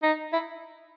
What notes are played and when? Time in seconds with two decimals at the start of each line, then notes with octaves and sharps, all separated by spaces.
0.03 D#4
0.33 E4